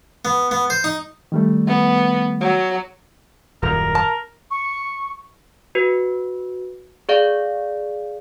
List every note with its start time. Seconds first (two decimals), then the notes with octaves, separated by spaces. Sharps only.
0.25 B3
0.51 B3
0.70 C5
0.84 D#4
1.32 D#3 G3 A3
1.67 B3
2.41 F#3
3.62 D#1 F#2 A#4
3.95 A5
4.51 C#6
5.75 F#4 B4
7.09 G#4 D5 F5